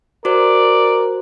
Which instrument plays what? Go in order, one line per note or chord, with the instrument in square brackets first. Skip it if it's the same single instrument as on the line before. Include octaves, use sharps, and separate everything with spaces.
[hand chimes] F#4 C5 [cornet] A#4 [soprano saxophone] D5